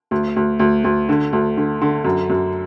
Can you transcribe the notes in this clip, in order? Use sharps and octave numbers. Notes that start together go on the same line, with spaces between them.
D2
D2
D2
D2
D3
D2
D3
D3
F#2
F#2